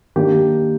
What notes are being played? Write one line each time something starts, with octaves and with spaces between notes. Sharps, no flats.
D#3 A#3 D4 G4